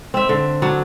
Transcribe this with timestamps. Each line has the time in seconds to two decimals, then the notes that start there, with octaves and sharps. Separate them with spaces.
0.14 C4 E5
0.29 D3
0.62 F#3 D4